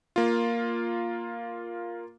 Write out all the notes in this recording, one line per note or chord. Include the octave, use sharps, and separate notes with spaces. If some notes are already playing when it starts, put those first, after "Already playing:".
A#3 F4